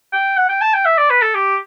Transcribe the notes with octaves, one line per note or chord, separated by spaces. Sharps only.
G5
F#5
G5
A5
G5
E5
D5
B4
A4
G4